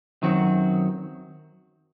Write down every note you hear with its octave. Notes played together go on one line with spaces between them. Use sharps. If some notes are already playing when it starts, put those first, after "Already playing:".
F#2 D#3 F#3 C4 F#4